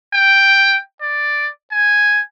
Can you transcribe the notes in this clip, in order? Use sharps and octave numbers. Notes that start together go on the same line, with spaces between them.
G5
D5
G#5